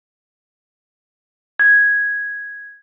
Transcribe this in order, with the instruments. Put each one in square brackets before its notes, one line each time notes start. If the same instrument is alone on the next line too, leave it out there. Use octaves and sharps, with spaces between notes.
[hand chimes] G#6